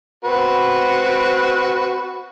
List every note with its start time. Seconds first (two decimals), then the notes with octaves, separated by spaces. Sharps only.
0.25 C4 F#4 B4